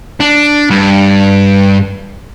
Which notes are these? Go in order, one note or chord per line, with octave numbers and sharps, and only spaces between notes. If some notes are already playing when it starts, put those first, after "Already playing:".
D4
G2